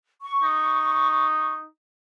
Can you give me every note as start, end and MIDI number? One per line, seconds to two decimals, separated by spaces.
0.23 1.53 85
0.43 1.67 63